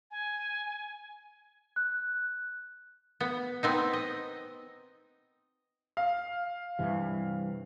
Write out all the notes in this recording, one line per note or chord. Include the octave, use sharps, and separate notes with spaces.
G#5
F#6
B3
B3 C4 D#4
D#5
F5
G2 C3 E3